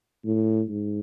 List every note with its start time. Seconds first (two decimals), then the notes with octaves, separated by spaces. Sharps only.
0.25 A2
0.69 G#2